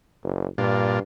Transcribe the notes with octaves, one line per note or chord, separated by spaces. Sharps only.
F#1
G2 A#2 D4 F4